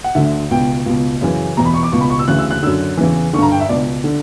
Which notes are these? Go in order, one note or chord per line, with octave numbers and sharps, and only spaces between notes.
F#5
D2 D3 E5
C#2 B2 G5
C#2 B2
F#2 C#3 E3
E2 B2 A#5
B5
C#6
D6
C#2 B2 C#6
B5
C#6
E6
D2 C#3 E3 F#6
E6
F#6
F#2 D3 E6
E2 C#3 E3
G2 D3 A#5 C#6
G5
E5
C#2 B2 D5
D3